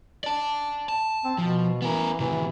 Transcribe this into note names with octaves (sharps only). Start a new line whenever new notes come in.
D5 A5
A5
C4
B2 F3
E3 B3 A#4
A2 C3 E3